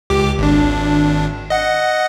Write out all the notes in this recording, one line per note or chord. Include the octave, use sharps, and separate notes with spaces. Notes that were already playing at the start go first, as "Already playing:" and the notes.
C#2 G4 D6
G#1 D4
D#5 F#5